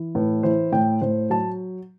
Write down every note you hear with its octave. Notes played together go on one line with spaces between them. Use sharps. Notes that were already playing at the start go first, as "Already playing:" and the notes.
Already playing: E3
A2 B4
E3 C5
A2 G5
A2 C5
F#3 A5